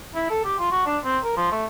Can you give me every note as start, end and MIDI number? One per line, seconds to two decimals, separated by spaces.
0.15 0.29 64
0.30 0.44 69
0.45 0.55 67
0.59 0.67 65
0.71 0.85 66
0.86 0.98 62
1.05 1.17 60
1.24 1.36 70
1.37 1.48 53
1.52 1.65 57